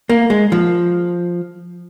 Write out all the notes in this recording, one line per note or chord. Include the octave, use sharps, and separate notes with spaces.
A#3
G#3
F3